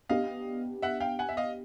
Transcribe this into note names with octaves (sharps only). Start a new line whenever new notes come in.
B3 D4 G4 D#5 F5
E5 F#5
F5 G5
F#5 G#5
E5
D#5 F5